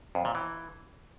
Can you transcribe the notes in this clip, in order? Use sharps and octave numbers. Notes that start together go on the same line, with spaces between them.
F2
A#2
E3